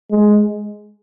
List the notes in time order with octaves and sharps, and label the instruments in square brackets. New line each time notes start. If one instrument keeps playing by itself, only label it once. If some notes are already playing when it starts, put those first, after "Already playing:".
[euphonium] G#3